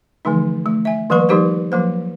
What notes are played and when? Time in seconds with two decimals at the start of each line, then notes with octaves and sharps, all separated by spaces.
0.25 D3 E3 F3 A3 D#4
0.66 A3
0.85 E5 G#5
1.10 D#3 F3 G3 A#3 B4 C#6
1.29 F3 G3 D#4 G4 A#4 C5
1.72 F3 F#3 A#3 C5